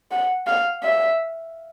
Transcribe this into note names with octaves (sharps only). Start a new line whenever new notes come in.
F#5
F5
E5